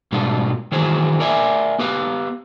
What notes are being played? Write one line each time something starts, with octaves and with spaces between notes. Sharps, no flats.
G#2 B2 G3 D4 F4
D#3 E3 F#3 G#4 C5
A#4 D5 E5 G#5
B3 G4 B4 F5